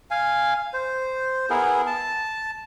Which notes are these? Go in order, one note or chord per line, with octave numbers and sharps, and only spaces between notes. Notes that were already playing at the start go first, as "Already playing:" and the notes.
F5 G#5
C5
B3 E4 G#4 A#4
A5